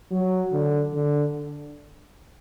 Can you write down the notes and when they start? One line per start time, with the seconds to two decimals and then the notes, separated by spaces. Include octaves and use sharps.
0.11 F#3
0.52 D3
0.94 D3